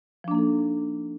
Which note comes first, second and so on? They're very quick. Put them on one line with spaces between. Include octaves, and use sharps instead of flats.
F3 D4 A#3 D#4 A4